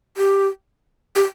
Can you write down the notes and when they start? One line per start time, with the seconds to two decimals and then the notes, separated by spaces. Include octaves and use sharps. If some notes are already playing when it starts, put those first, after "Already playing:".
0.17 G4
1.16 G4